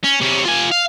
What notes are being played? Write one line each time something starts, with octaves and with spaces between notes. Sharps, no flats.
C#4
C3 C#4
F4 G#5
F5